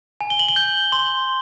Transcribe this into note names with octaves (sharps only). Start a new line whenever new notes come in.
G#5
G7
F#7
G7
G6
C6